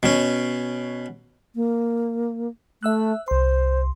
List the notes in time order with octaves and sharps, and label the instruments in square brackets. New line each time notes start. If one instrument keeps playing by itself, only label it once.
[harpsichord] B2 C#4
[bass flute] A#3
[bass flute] A3 [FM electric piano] E5 E6 F#6
[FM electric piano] C2 C6 [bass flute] C5